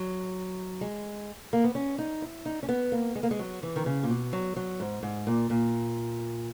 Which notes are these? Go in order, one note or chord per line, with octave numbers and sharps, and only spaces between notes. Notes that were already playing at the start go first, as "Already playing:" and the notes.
Already playing: F#3
G#3
A#3
B3
C#4
D#4
E4
D#4
C#4
B3
A#3
G#3
A#3
G#3
F#3
E3
D#3
C#3
A#2
B2
F#3
F#3
G#2
G#2
A#2
A#2